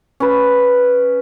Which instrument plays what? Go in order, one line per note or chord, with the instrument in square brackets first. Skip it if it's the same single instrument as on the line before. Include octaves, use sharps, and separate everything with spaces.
[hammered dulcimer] C#4 B4